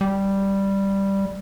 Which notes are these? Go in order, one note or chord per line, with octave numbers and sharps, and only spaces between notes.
G3